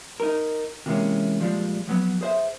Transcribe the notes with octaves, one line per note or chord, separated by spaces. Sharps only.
D#4 A#4
C3 E3 G3 G#3 A#3 C#4
A#2 F3 G3 G#3
F3 F#3 B3
G#4 C5 E5